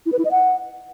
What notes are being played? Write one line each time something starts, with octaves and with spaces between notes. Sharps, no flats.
E4
B4
E4
D#5
F#5